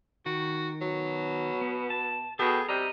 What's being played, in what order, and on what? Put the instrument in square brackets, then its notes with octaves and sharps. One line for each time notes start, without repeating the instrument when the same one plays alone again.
[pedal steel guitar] D#3 [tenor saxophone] F#4
[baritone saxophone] B2 [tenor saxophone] F#3
[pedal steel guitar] B3
A5
[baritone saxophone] B2 [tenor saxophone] G#4 [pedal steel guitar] A4 G5
[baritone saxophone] C3 [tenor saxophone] G3 [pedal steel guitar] D#5 A#5